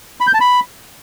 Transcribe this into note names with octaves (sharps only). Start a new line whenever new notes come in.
B5
G6
A5
B5